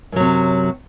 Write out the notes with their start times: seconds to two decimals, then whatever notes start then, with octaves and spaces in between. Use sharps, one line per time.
0.12 F#2
0.16 F#3
0.20 C3